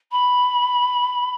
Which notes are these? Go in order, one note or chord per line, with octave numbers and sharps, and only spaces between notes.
B5